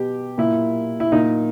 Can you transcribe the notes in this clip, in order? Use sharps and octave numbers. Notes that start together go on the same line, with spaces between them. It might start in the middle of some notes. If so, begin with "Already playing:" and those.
Already playing: B2 G4
A#2 E4
E4
A#2 D#4